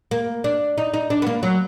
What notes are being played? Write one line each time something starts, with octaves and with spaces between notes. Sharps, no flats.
A#3
D4
D#4
D#4
D4
B3
A#3
F#3